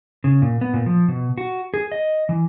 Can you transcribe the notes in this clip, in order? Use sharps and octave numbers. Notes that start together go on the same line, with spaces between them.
C#3
A#2
B3
A#2
F3
B2
F#4
G#4
D#5
E3